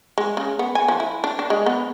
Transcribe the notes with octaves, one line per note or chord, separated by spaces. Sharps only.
G#3
C#3
B3
G#5
F3
E4
D4
D4
G#3
B3